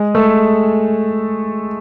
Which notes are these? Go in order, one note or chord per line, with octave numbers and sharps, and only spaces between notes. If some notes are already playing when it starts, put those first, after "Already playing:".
Already playing: G#3 G#4
A3 A4